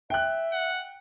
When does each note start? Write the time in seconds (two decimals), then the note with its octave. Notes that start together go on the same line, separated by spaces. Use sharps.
0.10 E5 G5 F#6
0.52 F#5